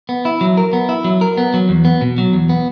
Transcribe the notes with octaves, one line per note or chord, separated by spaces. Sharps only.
B3
E4
F#3
A#4
B3
E4
F#3
A#4
B3
F#3
E2
B3
B2
F#3
E2
B3